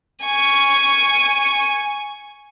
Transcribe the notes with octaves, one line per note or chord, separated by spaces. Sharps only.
G#5 C#6